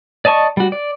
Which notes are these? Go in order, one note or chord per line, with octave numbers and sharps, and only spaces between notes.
D5 D#5 A5 C#6
G3 F#4
D5